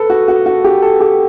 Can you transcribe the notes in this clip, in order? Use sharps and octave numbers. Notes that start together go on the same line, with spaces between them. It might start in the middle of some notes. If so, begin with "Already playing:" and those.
Already playing: A4 B4
F#4
F#4
F#4
G4
A4
G4